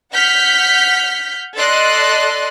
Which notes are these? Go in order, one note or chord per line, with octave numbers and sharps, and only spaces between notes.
F#5 F6 G6 B6
A4 D5 D#5 C6 F#6